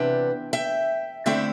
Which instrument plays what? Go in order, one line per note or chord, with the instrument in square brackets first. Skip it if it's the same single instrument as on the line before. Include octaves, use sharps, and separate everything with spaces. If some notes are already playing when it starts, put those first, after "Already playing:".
Already playing: [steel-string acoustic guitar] C3 E3 B3 D4 E5 G5
E5 G5
D3 A3 C4 E4 E5 G5